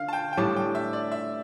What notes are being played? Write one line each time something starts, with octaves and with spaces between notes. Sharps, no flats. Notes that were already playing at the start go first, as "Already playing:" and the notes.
Already playing: D3 F5
A5
G5
G5
A2 G3 D4 A5
G5
E5
D5
E5